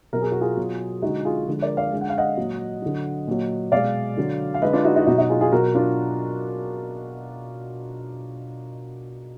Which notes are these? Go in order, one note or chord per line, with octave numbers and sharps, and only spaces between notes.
B2 F#3 A#4
G#4
F#4
F4 G#4
B2 F#3
D3 G#3 D#4 F#4
F4 G#4
D3 F3 G#3
A#4 D5
D5 F5
D3 G#3
F#5
F5
D#5 F#5
A#2 F#3
D3 F#3
A#2 F#3
B2 G#3 D5 F5
D3 F#3
F5
D3 G#3 B4 D#5
D4 F4
D#4 F#4
D#4 F#4
B2 F#3 D#4 F#4
D#4 F#4
F4 G#4
F4 G#4
B2 F#3 F#4 A#4
D4 F4